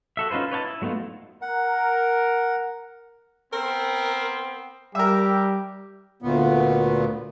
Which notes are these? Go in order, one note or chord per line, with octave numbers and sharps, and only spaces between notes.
F#4 A4 E5
C#4 D#4 F4 B4 C5
B4 C#5 D#5 G5 A5
E4
F#3 A3 B3 D#4 F4
A#4 F#5
B3 C4 A#4
G3 G4 A#4 E5
D2 A#2 B3